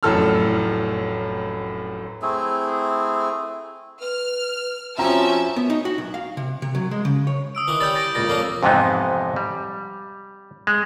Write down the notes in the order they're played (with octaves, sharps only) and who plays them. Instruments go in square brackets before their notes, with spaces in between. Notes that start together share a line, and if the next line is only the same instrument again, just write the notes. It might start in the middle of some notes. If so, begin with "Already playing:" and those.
[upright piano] F1 F#2 A2 A4 E6 F6
[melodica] A3 C4 E4 G#4
[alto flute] B4 [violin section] F6
[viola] F3 C#4 [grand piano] C4 A#5 [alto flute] F#4 [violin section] E5 A5
[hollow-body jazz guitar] B3
D#4
F#4
B1
F5
C3
C3
F#3
G#3
C#3
C#5
[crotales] D#6 E6 D7
[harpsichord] D#3 E3 [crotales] D#6
[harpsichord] G3 C#4 [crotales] G6 A6
[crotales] A6 A#6 D7
[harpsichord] C#2 A#2 [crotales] A6 A#6
[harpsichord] F2 A#3 C#4
[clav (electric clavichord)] F2 G#2 C3 E3 B3 D#4
G3
G#3